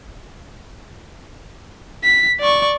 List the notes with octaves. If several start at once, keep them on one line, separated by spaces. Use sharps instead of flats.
B6
D5 C#6